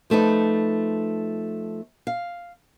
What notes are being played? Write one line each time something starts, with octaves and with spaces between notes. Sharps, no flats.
F3 A3 D#4 B4
F5